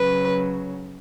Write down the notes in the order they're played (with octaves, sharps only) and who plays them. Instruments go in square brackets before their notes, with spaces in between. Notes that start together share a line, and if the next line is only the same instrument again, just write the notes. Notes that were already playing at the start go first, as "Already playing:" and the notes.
Already playing: [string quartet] C#3 F#3 B4